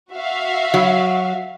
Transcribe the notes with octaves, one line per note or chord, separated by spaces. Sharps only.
F#4 E5 F5
F#3